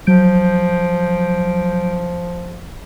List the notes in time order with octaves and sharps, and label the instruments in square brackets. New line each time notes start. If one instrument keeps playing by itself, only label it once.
[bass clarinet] F3 [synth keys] F#3 G6 D7